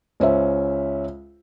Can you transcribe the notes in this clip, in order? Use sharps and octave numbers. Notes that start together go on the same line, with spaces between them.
C#2 C#4 C5 E5